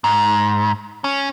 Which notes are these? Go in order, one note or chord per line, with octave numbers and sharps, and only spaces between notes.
G#2
C#4